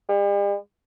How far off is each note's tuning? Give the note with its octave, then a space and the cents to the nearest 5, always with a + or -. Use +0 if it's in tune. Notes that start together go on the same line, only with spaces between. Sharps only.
G3 +45